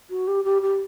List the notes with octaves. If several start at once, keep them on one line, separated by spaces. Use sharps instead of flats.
F#4
G4
G4
G4